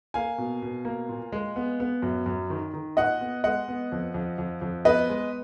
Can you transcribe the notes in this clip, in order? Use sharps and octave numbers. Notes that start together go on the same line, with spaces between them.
A#3 F5 G#5
B2
B2
A#3
A#2
G#3
B3
B3
F#2
F#2
D#3
D#3
A#2 D#5 F#5
B3
G#3 D#5 F#5
B3
F2
F2
F2
F2
B3 B4 D#5
G#3